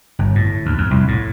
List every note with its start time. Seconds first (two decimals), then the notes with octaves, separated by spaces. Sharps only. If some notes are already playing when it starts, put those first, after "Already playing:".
0.19 G1
0.35 A2
0.65 D2
0.78 F2
0.91 C2
1.08 A2